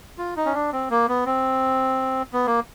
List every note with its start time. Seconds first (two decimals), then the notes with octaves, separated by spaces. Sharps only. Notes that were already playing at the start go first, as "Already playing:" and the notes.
0.18 F4
0.37 D#4
0.46 C#4
0.54 D4
0.72 C4
0.90 A#3
1.08 B3
1.26 C4
2.33 B3
2.47 A#3